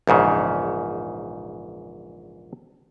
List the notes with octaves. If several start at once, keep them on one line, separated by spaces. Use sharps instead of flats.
A#1 E2 G#2 C#3